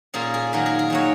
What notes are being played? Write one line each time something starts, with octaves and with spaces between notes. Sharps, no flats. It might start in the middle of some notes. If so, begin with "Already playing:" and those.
A#2 A#3 C#4 G#4
G#4
D#3 F#3 A#3 A#4
G#4
G#4
D#3 F#3 A#3 C#5